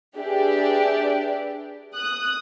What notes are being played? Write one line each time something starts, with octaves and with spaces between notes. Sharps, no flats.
D4 G4 G#4 B4 D5 E5
D#6 F#6